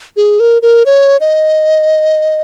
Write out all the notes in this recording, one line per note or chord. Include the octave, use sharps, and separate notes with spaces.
G#4
A#4
A#4
C#5
D#5